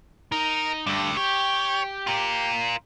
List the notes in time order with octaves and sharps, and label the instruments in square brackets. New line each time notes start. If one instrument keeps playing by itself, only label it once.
[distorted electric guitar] D#4 [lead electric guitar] A#4
[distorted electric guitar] G2 [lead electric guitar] D3 A3
[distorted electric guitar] G4 [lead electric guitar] C#5
[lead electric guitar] F4 A#4